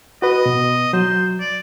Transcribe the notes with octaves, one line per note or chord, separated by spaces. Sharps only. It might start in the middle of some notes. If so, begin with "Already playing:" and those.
F#4 B4 D#5
B2
F#3 C5
D5